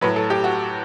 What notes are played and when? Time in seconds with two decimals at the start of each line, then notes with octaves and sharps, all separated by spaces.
0.01 A2 F#3 B4
0.16 A4
0.30 G4
0.44 F#4